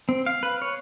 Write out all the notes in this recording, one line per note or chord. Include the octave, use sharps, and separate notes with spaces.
C4
F5
B4
C#5